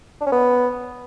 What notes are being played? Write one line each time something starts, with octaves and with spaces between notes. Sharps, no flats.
D4
C#4
B3